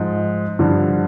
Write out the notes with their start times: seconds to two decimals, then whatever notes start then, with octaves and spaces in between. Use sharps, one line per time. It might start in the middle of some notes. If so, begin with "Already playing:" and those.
Already playing: G#2 F3
0.59 G2 D3 F3